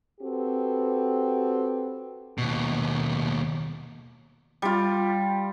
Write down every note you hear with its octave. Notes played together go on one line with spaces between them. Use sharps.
C4 F#4 G4 A4 B4
D#2 B2
G3 F4